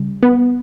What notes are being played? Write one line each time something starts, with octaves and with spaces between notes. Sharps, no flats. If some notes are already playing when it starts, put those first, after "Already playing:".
Already playing: C#3 G3
B3